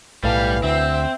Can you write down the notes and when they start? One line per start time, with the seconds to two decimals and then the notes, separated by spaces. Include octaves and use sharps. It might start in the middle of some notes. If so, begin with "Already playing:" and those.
0.24 B1 A2 E3 G3 F5
0.63 D2 C4 E5